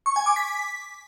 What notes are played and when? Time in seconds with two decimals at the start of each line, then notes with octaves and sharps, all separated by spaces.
0.06 C#6
0.16 G#5
0.26 D6
0.36 B6